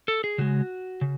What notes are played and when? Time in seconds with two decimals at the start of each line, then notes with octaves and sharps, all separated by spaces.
0.08 A4
0.24 G#4
0.38 C#3 G#3 F#4
1.01 C#3